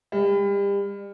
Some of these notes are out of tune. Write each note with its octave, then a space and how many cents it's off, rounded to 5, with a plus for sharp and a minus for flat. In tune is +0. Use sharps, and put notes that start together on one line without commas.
G3 +35